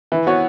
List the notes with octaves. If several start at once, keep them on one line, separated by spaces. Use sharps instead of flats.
E3
B3 F#4 C#5